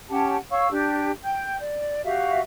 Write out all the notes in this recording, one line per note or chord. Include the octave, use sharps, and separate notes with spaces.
C#4 G4 F#5 A5
C#5 F5 C#6 E6
D4 G4
G5 G6
D5
F#4 G4 E5 F5